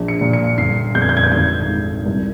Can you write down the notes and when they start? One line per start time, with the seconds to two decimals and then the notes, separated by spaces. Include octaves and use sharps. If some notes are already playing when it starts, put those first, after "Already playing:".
Already playing: A#1
0.08 C#7
0.21 A#2
0.33 C#7
0.58 G1 C7
0.95 F2 G6
1.02 G#6
1.09 G6
1.17 G#6
1.24 G6
1.32 G#1 G#6
1.69 G#2
2.06 C2